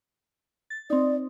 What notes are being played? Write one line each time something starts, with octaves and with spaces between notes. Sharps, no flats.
A6
C4 D#4 D5